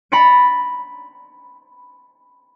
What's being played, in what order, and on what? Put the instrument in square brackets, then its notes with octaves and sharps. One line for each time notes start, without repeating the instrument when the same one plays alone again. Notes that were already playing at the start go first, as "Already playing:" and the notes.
[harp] A#5 B5 A6 C#7 D7